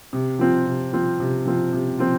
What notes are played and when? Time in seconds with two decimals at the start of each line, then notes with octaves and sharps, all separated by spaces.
0.13 C3
0.39 F3 C4 F4
0.67 C3
0.93 F3 C4 F4
1.20 C3
1.46 F3 C4 F4
1.73 C3
1.99 F3 C4 F4